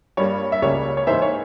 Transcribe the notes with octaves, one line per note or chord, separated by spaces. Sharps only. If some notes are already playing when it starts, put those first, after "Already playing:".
G2 G3 A#3 C#5
E5
C#2 C#3 G3 A#3 C#5
C#5
G#2 E3 A#3 C5 E5
C#5